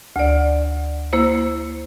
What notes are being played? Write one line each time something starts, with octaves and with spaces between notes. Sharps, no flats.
D2 D5
A#3 E4 C5